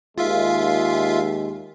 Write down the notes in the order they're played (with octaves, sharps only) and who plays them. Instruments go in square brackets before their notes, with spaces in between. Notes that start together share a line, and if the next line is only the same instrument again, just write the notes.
[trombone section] D#2 G#3 [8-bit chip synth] F4 E5 F5